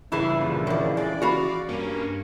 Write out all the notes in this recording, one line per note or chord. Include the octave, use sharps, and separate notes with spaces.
C#2 G2 C#3 E3 E4
A#2 D3 F3
D#3 D5
G#3 D5
F#4 F5 B5
G2 A#3 C#4